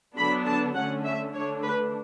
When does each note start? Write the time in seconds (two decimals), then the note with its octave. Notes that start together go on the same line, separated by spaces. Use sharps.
0.16 D3 F#3 B3 D4 B5
0.46 A5
0.75 D3 A3 C#4 F#5
1.05 E5
1.35 D3 A3 D4 C#5
1.63 B4